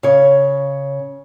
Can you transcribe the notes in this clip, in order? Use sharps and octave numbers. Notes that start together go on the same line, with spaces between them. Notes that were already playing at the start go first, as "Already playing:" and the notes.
C#3 C#5